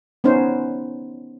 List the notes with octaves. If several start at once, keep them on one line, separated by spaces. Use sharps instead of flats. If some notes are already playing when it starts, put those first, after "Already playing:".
B3 C#4 D#4 C5